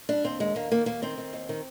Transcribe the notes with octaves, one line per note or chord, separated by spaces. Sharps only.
G3 D4
D#2 C4
D#2 G#3
D#2 A#3
D#3 A#3
D#2 A#3
D#3 C4
D#3
D#2
D#3